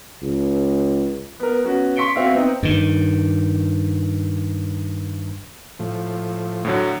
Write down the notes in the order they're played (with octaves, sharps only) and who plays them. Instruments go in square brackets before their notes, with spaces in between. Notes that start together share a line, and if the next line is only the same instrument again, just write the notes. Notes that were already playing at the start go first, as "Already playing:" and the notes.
[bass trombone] C#2
[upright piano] B3 A#4
B3 C#4 F#4
C6 C#6 B6 C#7 D7 G7
C4 F#4 E5 F5
B3 C4 D#4
[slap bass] G2 D#3
[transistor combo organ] A2 F3
[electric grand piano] A2 D3 F#3